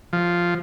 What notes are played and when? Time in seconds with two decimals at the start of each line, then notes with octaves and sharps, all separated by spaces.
0.13 F3